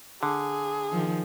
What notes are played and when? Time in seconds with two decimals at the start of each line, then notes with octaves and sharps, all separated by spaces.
0.23 D3 G#4
0.92 D#3 F3